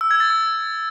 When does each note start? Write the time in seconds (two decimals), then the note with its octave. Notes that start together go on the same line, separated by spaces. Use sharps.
0.01 E6
0.11 G#6
0.20 A6
0.30 E6